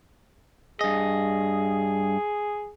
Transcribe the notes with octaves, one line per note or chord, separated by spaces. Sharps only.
G2 G#4 D#5